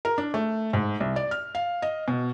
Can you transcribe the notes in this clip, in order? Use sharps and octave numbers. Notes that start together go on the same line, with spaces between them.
A#4
D4
A3
G#2
C2
D5
F6
F5
D#5
B2